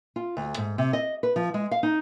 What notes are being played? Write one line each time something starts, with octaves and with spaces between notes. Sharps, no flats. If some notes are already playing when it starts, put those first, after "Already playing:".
F4
D2
G#2
C3
D#5
B4
F3
G#3
F5
D#4